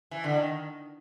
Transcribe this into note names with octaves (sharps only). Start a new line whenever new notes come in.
E3
D3
D#3